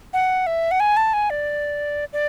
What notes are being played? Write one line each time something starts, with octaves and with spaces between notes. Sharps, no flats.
F#5
E5
F#5
G#5
A5
G#5
D5
D5